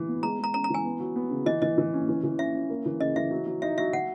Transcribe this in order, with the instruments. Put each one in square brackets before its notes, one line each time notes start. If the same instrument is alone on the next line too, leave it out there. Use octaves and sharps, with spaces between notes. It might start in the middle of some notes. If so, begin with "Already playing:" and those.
Already playing: [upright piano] E3
B3
[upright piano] G#3 [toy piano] A#5
[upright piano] G#3 [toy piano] A#5
[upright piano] C#4 [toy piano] A#5
[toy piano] A#5
[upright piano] E3 [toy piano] G#5
[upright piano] B3
F#3
B3
C#3
[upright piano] E3 [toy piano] D#5
[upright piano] E3 [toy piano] D#5
[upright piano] E3
C#4
E3
E3
[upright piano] C#4 [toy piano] E5
[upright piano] C#4
A#3
E3
[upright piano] C#3 [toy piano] D#5
[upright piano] E3 [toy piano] E5
[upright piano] F#3
F#3
[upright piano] D#4 [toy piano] E5
[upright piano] F#3 [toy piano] E5
[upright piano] F#3 [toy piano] F#5